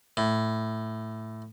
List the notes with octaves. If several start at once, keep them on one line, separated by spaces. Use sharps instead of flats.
A2